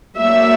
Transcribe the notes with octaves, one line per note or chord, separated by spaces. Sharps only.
F#3 A#3 D4 E5